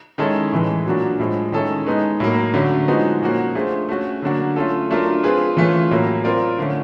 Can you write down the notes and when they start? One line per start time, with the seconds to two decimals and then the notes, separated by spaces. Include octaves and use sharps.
0.18 D#3 G#3 C#4 E4 A4
0.52 A2 E3 G#3
0.86 A#2 F#3 A#3 D4 F#4
1.19 A2 F3 G#3
1.52 D#3 G#3 C#4 E4 A4
1.86 G#3 B3 D#4
2.20 A2 F#3 A#3
2.54 D3 F#3 A3 C#4
2.87 F3 G#3 B3 D#4 F#4
3.22 A#2 F3 A#3 C#4 F#4
3.55 A3 D4 F4 G#4 C5
3.89 A3 C#4 F#4
4.22 D3 F#3 A#3 D4 F#4
4.56 A3 C#4 F4 A4
4.90 F#3 A3 D4 F4 A#4
5.23 C4 F4 G#4 B4
5.57 E3 A3 C#4 F4
5.91 A2 F#3 A#3
6.24 C4 F4 A#4 D5
6.58 D3 F3 A3 C#4